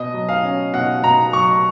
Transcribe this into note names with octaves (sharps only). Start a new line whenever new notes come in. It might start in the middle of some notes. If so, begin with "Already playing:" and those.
Already playing: B2 D#5
F#3
F5
C#4
B2 F#5
B2 A#5
F#3 C#6